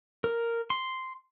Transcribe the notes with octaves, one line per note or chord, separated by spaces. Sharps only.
A#4
C6